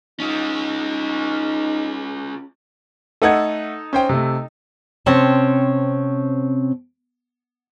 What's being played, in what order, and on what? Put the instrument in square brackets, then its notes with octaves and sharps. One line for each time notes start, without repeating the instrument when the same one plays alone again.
[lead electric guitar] C#4 F4 [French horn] D#4
[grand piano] A3 F#5 G#6 [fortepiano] D#4 A4
[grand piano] C#4 C5 G5
C3 A3
[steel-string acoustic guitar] C3 C4 C#4 C#5 A5